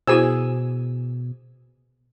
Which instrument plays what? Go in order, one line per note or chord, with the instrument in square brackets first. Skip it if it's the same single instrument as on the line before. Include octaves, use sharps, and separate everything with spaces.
[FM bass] B2 [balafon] E4 F#4 C5 [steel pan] G#4 G#5 E6